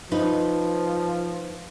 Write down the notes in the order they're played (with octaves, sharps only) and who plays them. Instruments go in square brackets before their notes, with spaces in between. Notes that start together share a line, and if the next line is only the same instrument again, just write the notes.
[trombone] F3 [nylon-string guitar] D#4 B4